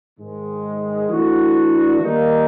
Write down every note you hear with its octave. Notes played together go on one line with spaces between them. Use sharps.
G#2 D#3 G#3
E3 A3 D4 F#4
D#3 G3 A#3 D#4